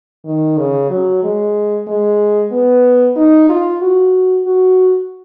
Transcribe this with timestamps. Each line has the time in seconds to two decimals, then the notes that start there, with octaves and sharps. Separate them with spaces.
0.25 D#3
0.58 C#3
0.90 F#3
1.23 G#3
1.87 G#3
2.52 B3
3.16 D#4
3.49 F4
3.81 F#4
4.46 F#4